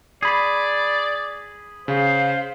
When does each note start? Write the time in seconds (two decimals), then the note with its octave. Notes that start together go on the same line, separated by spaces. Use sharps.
0.23 G#4 D5 B5
1.88 C#3 C5 F5